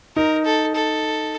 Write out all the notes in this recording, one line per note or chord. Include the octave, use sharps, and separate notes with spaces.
D#4 A#4
A4
A4